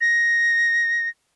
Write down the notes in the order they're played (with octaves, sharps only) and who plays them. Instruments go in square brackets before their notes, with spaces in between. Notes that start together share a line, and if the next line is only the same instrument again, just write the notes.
[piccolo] A#6